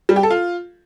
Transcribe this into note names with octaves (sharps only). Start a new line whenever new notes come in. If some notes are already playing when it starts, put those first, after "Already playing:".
G3
G4
A4
F4